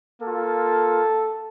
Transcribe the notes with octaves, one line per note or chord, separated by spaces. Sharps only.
A#3 F4 A4